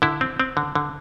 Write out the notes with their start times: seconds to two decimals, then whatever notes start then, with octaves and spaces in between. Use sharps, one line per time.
0.02 D3 E4
0.21 C4
0.40 C4
0.57 D3
0.75 D3